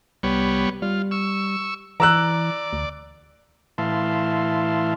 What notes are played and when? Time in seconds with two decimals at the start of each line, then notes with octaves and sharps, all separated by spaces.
0.23 C2 G3 B3 C#5
0.82 G3 F4
1.11 C#6 E6
2.00 E3 D5 A#5 E6 F#6
2.73 D2
3.78 A2 E3 E5 F5 A5 C6